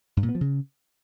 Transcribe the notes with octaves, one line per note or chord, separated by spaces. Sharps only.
G2
A#2
B3
F3
C#3